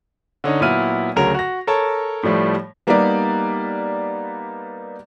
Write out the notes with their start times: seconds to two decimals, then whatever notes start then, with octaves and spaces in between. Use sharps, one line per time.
0.44 D3 C#4 D#4
0.61 A#2 F#3 B3 E4 F6 D#7
1.16 D2 C#3 F#3 A#4 F7
1.34 F#4 A#6
1.67 A4 A#4 C#5 A5
2.23 A2 F3 G3 A3
2.87 G3 A#3 B3 D#4 B4 D5